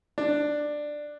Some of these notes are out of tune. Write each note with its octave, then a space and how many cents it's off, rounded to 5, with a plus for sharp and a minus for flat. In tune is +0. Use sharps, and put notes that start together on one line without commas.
D4 +10